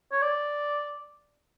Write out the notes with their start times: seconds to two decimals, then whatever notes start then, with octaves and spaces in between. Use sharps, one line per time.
0.12 C#5
0.22 D5